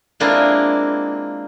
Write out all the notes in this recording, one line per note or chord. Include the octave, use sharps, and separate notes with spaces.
G#3 A#3 C4 D4 E4 F4